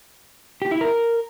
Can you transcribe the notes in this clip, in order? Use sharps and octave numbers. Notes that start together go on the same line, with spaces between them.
G4
E4
A#4